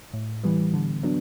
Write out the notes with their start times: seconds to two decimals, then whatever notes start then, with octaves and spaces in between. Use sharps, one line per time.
0.13 A2
0.43 E3 G3 B3
0.74 D3
1.03 F#3 B3 D4